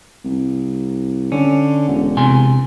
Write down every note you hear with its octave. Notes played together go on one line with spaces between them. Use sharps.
C2
D3 C#4
E1
C3 G#5 C6